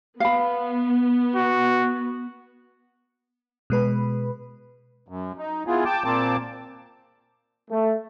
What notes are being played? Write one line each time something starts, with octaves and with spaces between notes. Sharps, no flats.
B3 F5 B5
F#4
B2 G#3 B4 B5
F#2
D#4
E3 B3 F4 G#4
G5 A5 D6
A#2 A#3 C4 A5 D6
A3